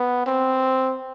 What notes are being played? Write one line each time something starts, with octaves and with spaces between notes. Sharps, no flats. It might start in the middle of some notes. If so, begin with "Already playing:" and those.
Already playing: B3
C4